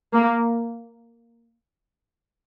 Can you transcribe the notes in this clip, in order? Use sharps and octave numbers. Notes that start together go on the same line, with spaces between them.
A#3